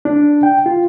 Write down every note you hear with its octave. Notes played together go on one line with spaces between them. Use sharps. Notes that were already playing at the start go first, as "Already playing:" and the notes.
D4
G5
F4